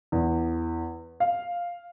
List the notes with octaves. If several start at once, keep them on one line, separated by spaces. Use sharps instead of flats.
E2
F5